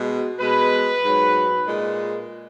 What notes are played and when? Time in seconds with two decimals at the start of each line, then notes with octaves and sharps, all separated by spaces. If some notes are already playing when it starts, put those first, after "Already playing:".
Already playing: B2 G#3
0.39 B2 G#3 B4
1.02 G#2 F#3
1.65 A#2 G#3